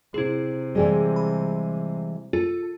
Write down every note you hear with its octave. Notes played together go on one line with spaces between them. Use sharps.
C3 E4 G#4
E3 G3 G#3
B5
F4 A4